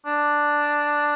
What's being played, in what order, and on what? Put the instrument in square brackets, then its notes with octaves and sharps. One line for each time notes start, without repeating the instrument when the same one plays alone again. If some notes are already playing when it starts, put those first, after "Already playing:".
[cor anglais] D4